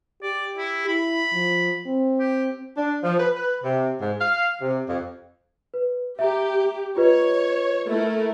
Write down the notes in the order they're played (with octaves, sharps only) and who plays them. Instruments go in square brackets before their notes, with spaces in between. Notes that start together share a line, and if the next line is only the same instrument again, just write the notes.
[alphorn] G4 [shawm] D5
[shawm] E4
[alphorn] E4 [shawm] B5
[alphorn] F3
C4
[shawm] G4
[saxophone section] D4
F3
B4
B4
C3
G#2
F5
C3
F2
[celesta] B4
[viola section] G4 [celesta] E5 A#5
[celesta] F4 B4 D#5 [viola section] C#5
[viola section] A3 E4 A#4